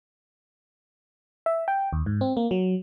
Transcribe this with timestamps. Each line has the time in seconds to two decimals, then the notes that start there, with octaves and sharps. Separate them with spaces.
1.46 E5
1.68 G5
1.93 D#2
2.06 G#2
2.21 C4
2.37 A#3
2.51 F#3